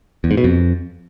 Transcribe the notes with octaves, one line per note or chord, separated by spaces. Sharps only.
E2
G#2
B2
F2